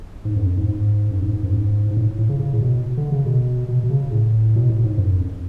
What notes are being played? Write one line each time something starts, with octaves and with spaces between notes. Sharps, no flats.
G#2
F#2
F2
G#2
G#2
F#2
G#2
G#2
F#2
G#2
G#2
A2
A2
C#3
C#3
A2
B2
D3
C#3
B2
B2
B2
C#3
A2
B2
A2
G#2
F#2
F2